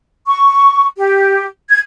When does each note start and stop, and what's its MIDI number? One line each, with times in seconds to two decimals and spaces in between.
0.27 0.87 85
0.97 1.45 67
1.70 1.79 92